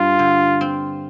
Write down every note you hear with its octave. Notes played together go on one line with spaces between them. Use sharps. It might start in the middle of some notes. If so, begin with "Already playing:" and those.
Already playing: G2 F4
D3
C4